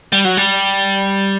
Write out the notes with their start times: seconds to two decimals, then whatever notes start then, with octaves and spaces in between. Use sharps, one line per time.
0.12 G3
0.25 F#3
0.37 G3